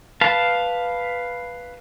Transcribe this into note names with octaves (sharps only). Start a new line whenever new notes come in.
B4 F5 A5